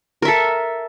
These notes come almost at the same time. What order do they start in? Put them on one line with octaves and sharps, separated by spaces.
A#4 E5 A4